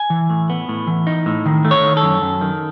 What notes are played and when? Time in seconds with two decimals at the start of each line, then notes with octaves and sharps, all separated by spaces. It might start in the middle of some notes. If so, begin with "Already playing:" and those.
Already playing: G#5
0.10 E3
0.30 A2
0.50 B3
0.69 A2
0.87 E3
1.07 D#4
1.26 A2
1.46 D#3
1.64 A3
1.71 C#5
1.84 D#3
1.97 A4
2.03 F#2
2.22 F#2
2.41 D#3